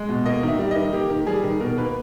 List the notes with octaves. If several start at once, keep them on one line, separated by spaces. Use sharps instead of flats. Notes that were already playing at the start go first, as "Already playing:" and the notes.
Already playing: G#3
B2
A#3 D#5
D#3 E5
G3
D#5
D#3
A#3 G4
D#3
G3 G#4
D#3
B2 A#4
A#3 B4